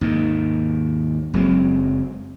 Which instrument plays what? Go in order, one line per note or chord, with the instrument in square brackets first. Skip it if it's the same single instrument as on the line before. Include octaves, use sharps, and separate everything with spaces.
[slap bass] D#2 G#2 D#3
F#1 F#3 G#3 C4